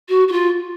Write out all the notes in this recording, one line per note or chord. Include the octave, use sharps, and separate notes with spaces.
F#4
F#4
F4